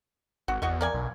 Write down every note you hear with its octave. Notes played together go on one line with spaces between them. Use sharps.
G#1 F#4
E2 F#4 D#5 C#6
A#3 D5 G#5
B1